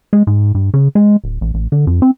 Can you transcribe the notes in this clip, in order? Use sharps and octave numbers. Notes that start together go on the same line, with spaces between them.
G#3
G#2
G2
C#3
G#3
D1
A1
A1
D3
F2
C4